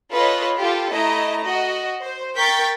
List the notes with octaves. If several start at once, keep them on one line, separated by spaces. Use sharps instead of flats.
F4 A4 B4 C#5 D#5
F4 G4 A4
A3 E4 D#5 A#5
F#4 D#5
C5
A#4 G5 C#6 G6 A6 B6